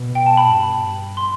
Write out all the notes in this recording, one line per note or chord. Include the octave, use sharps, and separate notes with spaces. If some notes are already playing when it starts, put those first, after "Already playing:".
Already playing: B2
G5
A5
B5
G2
C6